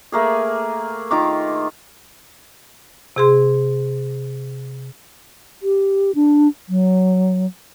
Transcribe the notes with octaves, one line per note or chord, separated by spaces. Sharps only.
A3 A#3 G#4
D#3 F4 D6
C3 G#4 C6
G4
D4
F#3